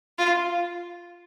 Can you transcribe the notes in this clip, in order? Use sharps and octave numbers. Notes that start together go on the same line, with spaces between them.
F4